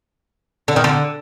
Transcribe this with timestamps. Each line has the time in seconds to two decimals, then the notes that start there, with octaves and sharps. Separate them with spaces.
0.68 D3
0.76 D#3
0.84 D3